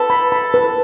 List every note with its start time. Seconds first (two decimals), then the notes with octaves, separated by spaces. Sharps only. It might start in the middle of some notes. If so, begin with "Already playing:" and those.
Already playing: A4 B4
0.10 B5
0.32 B5
0.54 B4